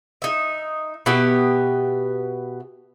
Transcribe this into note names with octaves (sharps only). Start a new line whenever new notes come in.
D#4 E5
B2 B3 G4 E5